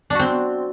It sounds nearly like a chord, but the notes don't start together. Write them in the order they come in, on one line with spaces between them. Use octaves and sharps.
D4 F#4 C4